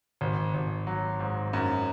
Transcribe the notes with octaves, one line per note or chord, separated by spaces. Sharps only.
G#1
G#1
F#3
G#2
F#2